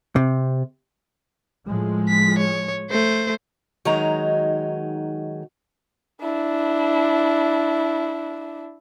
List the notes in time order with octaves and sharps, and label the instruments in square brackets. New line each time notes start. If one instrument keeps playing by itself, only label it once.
[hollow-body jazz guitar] C3
[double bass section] A2 F3 G#3
[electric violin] B6
C#5
A3 C5
[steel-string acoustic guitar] D#3 F#3 G#3 D#4 F#4 A#5
[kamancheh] D4 E4